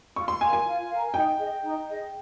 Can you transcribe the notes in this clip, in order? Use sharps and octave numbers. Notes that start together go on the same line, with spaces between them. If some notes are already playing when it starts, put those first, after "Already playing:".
F4 C#6
C6
A#4 F5 G#5
G#5
F4
A#4 F5
D#4 G5
G#4 D#5
D#4
G#4 D#5